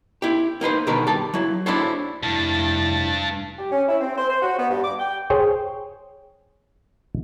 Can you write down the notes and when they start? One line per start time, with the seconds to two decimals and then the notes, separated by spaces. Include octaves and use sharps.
0.22 E4 G4
0.61 A#3 D#4 B4 C5
0.87 B2 D3 D#3 G3 A#4 B4
1.07 G4 A5
1.34 F#3 E4
1.66 D4 E4 F#4 A4 C5 C#5
2.23 F1 G2 E4 A5
3.57 G4
3.72 C#4
3.88 E4
4.01 C4
4.17 C5
4.29 C5
4.42 F#4
4.58 B3
4.69 G2
4.84 D6
4.99 G5
5.30 G#4 C5 C#5 G5